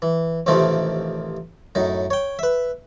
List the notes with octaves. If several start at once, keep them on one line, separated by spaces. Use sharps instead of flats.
E3
A1 D#2 C3 F3 A3 D#4
F#2 A2 D#4
C#5 G5
B4 E5